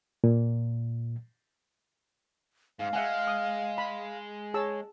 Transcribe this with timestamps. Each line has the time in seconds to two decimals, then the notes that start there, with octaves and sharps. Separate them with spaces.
0.24 A#2
2.80 G#2 F5
2.93 G#3 E5 F#5 G#5
3.27 D#6
3.78 B5
4.54 G#4 C#5 A5 E6